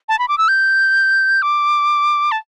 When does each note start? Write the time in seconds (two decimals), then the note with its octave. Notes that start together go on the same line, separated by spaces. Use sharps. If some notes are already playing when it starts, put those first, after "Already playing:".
0.09 A5
0.19 B5
0.28 D6
0.38 E6
0.48 G6
1.42 D6
2.32 A5